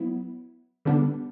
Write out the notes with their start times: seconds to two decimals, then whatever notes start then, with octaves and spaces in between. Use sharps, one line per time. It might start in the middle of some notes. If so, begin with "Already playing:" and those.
Already playing: F#3 B3 E4
0.85 D3 G3 B3 D4